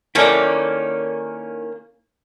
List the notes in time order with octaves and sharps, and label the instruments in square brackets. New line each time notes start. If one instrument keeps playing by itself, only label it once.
[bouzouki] D#3 A#3 C#4 [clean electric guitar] E4 A4 D5